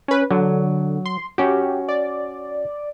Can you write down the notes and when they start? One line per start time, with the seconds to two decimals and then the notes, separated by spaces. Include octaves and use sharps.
0.08 C#4 B4
0.31 D3 F#3
1.06 C6
1.38 C#4 F#4 G4
1.89 D5